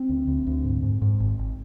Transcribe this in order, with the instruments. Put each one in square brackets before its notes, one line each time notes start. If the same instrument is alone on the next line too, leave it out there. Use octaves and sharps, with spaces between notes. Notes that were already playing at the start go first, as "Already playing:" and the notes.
Already playing: [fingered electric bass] C4
D2
D2
D2
G#2
G#2
G#2
G#1
G#1